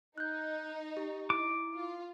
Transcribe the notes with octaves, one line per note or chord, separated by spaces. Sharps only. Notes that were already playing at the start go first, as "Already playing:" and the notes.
D#4 F#6 G6
G4
E4 D6
F4